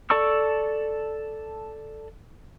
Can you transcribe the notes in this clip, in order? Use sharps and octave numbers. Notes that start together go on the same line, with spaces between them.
A4 D5 A5 C#6 E6